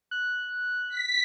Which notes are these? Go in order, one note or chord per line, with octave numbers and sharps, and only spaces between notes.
F#6
B6